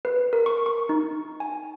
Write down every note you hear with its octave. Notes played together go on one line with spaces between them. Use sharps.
B4
A#4
C#6
C#6
D#4
G#5